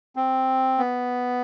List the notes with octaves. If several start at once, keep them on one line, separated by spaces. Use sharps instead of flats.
C4
B3